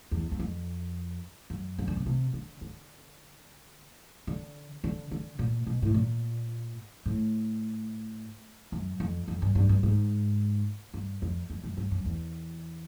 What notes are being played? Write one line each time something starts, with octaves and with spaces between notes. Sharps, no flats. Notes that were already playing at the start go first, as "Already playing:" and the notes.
E2
E2
F2
F#2
D#3
D3
C#3
C3
D3
D3
D3
D3
D3
A#2
B2
A2
A#2
A2
F#2
F2
F2
G2
G2
G2
G#2
G2
F2
F2
F#2
G2
F#2
E2